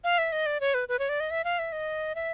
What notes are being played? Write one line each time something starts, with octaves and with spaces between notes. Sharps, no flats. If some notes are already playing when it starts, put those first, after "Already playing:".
F5
E5
D#5
D5
C#5
B4
B4
C#5
D5
D#5
E5
F5
E5
D#5
E5